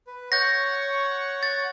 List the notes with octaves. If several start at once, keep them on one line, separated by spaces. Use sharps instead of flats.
B4
C#5 F#5 C#6 G6 A#6
A6